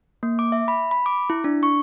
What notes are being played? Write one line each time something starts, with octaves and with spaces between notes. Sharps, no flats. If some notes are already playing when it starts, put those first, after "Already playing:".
A#3
D6
E5
B5
B5
D6
E4
D4
C#6